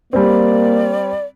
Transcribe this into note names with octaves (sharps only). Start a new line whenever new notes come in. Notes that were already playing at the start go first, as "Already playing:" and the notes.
G3 A#3 C4 D5